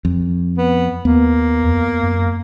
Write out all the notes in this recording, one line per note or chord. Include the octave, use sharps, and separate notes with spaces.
F2
B3
D#2 A#3 B3
F2
F#2